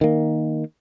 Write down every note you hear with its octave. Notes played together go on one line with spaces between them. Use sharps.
D#3 A#3